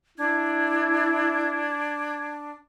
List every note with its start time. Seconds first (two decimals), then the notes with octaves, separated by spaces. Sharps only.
0.18 D4 E4 G#6